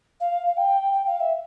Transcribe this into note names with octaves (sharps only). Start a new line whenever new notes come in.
F5
F5
G5
G5
F5
E5